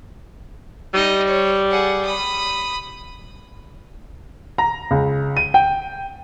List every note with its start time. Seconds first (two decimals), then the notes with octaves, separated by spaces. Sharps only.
0.94 G3 D#4 D#5
1.27 C#5
1.71 G#4 F#5
2.05 B5 D#6
4.58 A#5
4.91 C#2
5.37 D#7
5.54 G5